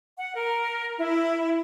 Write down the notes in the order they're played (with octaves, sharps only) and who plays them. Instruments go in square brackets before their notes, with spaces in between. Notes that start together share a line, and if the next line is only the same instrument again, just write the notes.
[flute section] F#5
A#4
E4